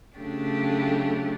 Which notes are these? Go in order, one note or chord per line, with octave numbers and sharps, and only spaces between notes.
C#3 F#3 A3 D4 G4